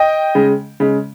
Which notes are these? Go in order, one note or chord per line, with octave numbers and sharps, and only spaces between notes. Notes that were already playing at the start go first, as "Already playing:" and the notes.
Already playing: D#5 G5
C#3 G#3
C#3 G#3